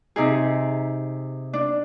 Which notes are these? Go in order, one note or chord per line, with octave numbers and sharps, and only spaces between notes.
C3 D#4 G#4
D4